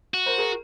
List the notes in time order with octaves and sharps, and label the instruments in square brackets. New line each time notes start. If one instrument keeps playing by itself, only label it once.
[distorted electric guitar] F#4
[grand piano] A#4 C5
G#4 A#4